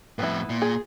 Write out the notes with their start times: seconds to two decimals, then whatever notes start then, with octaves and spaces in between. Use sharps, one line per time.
0.19 F2 A2 B3 E4
0.50 A#2
0.62 G#4